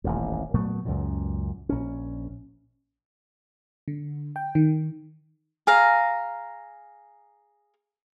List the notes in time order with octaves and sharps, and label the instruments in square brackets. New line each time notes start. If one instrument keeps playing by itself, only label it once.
[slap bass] D#1 A1 F2
A#2 F#3 A3 B3
C#2 F#2 A#2
A#1 C#4
[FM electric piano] D3
G5
D#3
[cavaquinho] G#4 F5 A#5